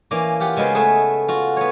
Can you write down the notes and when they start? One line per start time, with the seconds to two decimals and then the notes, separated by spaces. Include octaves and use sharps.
0.11 E3 A#3 C#4 D5 A#5
0.40 F4 G4 F#5
0.57 C#3 G#3 B3 B4 C5
0.74 A3 G#4 A4 B4 E5
1.28 F4 F#4
1.57 B3 C#5